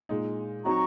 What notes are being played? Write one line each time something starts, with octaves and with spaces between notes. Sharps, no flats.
A#2 G#3 D#4
F#3 C4 D#4 F#4 A#5 C#6